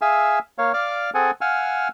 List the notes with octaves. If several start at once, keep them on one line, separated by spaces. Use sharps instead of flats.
G#4 E5 F5 G#5 E6
A#3 C#5 F5
D5 F5 D6 F6
C4 G#4 A4 F#5 G#5
F5 F#5 G#5 E6 F6